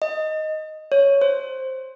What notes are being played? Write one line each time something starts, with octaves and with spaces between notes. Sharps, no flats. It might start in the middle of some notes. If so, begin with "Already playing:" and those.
D#5
C#5
C5